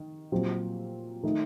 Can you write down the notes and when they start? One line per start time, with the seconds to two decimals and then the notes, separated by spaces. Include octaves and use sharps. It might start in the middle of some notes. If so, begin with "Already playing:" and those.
Already playing: D#3
0.32 A#2 F#3 C4 G4
1.23 D#3 A3 D#4